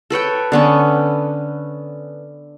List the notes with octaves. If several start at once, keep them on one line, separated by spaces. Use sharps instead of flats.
A4 B4 C#5 G5
D3 B3 C#4